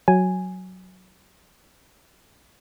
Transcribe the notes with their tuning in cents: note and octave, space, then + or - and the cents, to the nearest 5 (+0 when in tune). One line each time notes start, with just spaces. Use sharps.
F#3 +0 G#5 +0